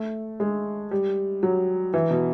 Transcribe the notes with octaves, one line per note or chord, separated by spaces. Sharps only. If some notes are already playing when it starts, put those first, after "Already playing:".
Already playing: A3
G#3
G3
F#3
E3
B2